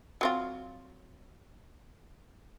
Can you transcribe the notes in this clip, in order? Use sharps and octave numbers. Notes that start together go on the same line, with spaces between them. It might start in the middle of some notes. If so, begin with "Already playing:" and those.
F#3 C4 F4